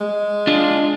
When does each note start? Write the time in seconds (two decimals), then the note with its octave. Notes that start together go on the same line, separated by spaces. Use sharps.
0.01 G#3
0.47 D4 F4